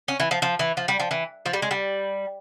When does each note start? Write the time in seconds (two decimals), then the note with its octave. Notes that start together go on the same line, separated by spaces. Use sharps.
0.08 C#4
0.20 E3
0.31 F3
0.42 F3
0.59 E3
0.77 F3
0.88 G3
1.00 F3
1.11 E3
1.46 F3
1.53 G3
1.62 G#3
1.71 G3